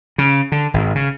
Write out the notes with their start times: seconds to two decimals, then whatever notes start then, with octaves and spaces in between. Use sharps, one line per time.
0.18 C#3
0.52 D3
0.74 G#1
0.95 C#3